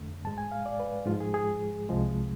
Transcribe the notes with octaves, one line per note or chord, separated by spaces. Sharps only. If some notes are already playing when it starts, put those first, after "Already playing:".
Already playing: F2 D3 A3
G#2 G#3 A5
G#5
F5
D5
B4
G#2 F3 G#3 F4
G#4
G#4
C2 C3 F3 G#3